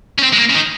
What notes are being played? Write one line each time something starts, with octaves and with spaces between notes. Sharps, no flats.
C#4
C4
G#3
A#3
C#3
D#3